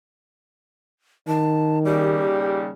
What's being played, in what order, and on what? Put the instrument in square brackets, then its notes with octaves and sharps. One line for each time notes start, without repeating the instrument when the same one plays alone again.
[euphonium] D#3 [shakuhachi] A5
[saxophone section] D#2 C#3 G3 [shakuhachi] G4